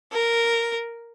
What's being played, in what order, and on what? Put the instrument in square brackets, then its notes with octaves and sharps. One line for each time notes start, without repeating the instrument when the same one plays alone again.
[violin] A#4